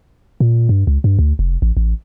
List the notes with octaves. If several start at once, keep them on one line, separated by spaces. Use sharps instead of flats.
A#2
G2
C#2
G2
D2
F1
A1
A1